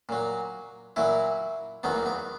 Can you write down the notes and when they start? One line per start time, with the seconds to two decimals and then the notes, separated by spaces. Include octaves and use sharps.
0.09 A#2 F#3
0.96 A#2 F#3 E4
1.83 E2 D#3 F#3 B3
1.95 A#3
2.06 B3